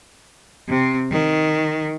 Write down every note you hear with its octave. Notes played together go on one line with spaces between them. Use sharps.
C3 C4
D#3